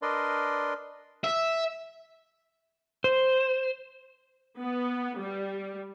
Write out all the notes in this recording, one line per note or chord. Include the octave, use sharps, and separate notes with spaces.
D4 A#4 B4 D5 D#5 C6
E5
C5
B3
G3